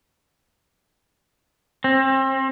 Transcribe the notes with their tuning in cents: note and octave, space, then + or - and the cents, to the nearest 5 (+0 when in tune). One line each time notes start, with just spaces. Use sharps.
C4 +35